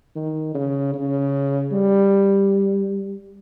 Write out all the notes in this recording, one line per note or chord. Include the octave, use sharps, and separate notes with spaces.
D#3
C#3
C#3
G3